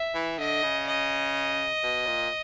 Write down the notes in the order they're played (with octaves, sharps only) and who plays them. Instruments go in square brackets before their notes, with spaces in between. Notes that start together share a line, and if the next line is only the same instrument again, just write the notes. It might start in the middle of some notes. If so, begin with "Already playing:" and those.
Already playing: [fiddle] E5
[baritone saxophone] E3
[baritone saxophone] D3 [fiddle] D#5
[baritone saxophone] C#3
[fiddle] D#5
[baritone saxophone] B2
A#2